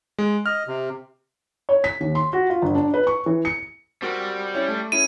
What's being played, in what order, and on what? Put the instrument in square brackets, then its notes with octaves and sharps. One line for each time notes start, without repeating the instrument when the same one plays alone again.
[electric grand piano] G#3
[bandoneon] D#5 [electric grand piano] F6
[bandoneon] C3
[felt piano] C#5
B6
D#2
C6
F#4
F4
G1
D4
B4
C#6
E3
C#7
[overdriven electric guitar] G3 [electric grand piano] C4 F#4 A#4
[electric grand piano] C#4 E4 C#5
A3
[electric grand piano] C#4 E4 G#4 [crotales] D#7